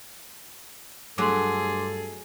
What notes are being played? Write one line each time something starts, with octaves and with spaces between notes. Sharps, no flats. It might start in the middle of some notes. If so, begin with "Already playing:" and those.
G2 F#3 A3 G#4 A4 C6 D6